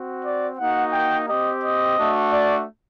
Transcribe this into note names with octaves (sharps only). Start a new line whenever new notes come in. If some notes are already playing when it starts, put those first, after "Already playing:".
Already playing: C4 F#4
D5
A#3 D#4 F#4 F#5
G5
C4 G4 D#5
D#5
A3 D4 F#4
D5